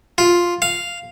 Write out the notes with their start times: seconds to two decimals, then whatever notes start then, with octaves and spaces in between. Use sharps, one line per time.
0.18 F4
0.62 F5